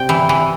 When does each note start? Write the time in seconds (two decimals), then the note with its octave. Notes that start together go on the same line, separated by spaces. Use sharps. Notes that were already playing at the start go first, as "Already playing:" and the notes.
Already playing: C3 G5
0.09 E3
0.29 E3